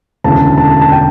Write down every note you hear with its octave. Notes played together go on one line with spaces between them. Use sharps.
E1 D2 C#3 E3 A5
A5
A5
G5